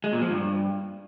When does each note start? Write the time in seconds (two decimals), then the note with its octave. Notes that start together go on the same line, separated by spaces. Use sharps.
0.04 G#3
0.13 A#2
0.22 F3
0.31 G2